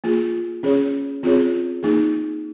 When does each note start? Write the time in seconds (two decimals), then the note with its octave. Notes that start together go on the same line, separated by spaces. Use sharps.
0.04 A#3 F4 G#4
0.63 C#4 G#4 C#5
1.23 C4 F4 G#4 C#5
1.83 A#3 D#4 G#4